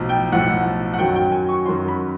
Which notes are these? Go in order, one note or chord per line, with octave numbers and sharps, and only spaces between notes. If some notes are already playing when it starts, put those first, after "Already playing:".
Already playing: B1 A2 F3
G5
B1 A2 F3 F#5
F#5
F#2 D#3 F#3 G5
G5
G#5
C#6
F#2 D#3 F#3 C6
B5